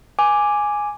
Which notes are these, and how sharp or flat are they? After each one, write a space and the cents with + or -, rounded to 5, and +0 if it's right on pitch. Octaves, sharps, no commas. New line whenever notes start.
G#5 +0 D6 +0